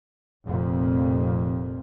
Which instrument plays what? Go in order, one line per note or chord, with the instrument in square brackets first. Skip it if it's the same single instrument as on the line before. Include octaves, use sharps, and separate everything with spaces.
[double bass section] F1 F2 A#2